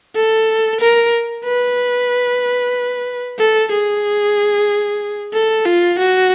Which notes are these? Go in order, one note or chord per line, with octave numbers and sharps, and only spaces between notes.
A4
A#4
B4
A4
G#4
A4
F4
F#4